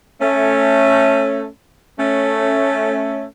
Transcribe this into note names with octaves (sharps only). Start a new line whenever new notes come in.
A3 C#4
A3 C#4